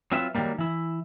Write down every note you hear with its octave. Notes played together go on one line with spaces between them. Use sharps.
F#3 C4 F4 B4 E5
D#3 E3 F#3 G3 A#3
E3 E4